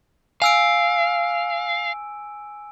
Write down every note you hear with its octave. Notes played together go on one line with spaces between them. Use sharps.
F5 G#5 E6 D7